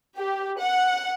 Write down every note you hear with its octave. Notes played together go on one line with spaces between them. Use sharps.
G4
F#5